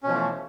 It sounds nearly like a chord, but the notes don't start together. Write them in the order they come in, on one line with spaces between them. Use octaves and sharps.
C#4 B2 F3 E3 A3